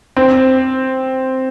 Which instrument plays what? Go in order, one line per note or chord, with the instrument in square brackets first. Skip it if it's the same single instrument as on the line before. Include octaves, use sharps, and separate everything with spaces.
[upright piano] C4